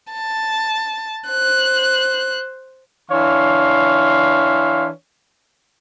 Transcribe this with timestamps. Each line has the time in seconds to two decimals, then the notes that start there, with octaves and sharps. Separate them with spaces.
0.13 A5
1.29 C5 F#6
3.11 E3 D4 C#5 F5 C6